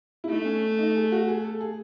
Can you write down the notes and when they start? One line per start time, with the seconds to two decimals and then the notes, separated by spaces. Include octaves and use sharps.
0.24 E4
0.29 A3 D#4
0.45 C#4
0.79 D#4
0.95 G#4
1.12 F#4
1.28 G#4
1.44 A4
1.61 G#4